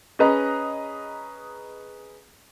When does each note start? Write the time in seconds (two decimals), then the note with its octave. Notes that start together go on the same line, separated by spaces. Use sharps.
0.19 C#4 G#4 B4 D#5 A#5